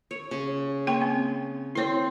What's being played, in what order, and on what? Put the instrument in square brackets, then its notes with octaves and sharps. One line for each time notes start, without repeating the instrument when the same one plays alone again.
[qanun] C#5
C#3
[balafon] A#3 G5 C6 [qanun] C#5
[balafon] C4
[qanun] C4 C6 [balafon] E4 C#5